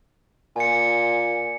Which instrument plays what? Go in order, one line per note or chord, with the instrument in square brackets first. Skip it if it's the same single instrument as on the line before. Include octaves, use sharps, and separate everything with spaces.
[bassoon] A#2 [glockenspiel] G#5 C#7